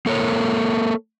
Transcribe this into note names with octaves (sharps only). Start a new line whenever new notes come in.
A#3 A4 A#4 C#5